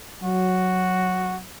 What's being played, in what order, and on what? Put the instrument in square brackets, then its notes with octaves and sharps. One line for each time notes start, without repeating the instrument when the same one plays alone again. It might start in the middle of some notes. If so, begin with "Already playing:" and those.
[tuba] F#3 [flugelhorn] F#4